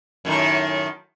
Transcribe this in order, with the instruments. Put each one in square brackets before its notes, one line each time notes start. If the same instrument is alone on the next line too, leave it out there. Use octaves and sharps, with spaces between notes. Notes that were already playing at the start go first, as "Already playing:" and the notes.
[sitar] F#2 A2 D#3